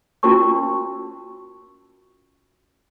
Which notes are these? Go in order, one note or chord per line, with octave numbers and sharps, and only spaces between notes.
C#4 F4 F#4 A#4 A5 C#6